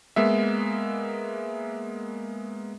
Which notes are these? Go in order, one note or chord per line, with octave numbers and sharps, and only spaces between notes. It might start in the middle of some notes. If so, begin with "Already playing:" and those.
G#3 A#3 B3 E5